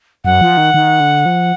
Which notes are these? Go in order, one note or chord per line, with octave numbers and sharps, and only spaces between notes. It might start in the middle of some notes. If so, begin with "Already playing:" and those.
F#2 F#5
F3
D#3
D#3
D3
F3